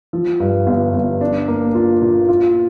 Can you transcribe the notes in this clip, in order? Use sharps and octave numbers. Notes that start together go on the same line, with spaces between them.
F3
G2
G1
G1
D4
A#3
F4
A#2
F4